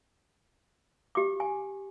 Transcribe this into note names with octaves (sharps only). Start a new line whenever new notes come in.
G4 D6
G#5